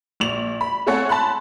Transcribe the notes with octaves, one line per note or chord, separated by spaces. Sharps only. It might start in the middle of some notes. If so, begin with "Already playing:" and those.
A#1 F7
B5
A3 C4 A4 C#5 F#5 G#5
A5 B5 C6 F#6